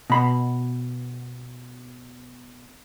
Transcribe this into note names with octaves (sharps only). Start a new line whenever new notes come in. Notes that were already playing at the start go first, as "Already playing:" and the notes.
B2 B5